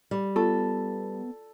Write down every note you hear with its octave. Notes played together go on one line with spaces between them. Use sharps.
G3
B3 F4 A4